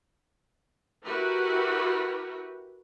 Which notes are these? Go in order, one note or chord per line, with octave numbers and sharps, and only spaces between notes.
E4 F#4 G4 A#4 B4